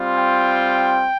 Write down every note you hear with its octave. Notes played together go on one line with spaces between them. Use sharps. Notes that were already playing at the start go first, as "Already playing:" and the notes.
Already playing: G3 C4 F4
G5